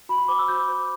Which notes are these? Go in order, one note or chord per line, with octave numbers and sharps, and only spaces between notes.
F#4 B5
C6
C5 D6
E6
F#4 G6
C5